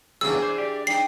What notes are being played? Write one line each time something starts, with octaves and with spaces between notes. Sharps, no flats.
E2 C#3 E3 G3 D4 G#4 E6
C5
G4 D5
D4 D#4 G5 C7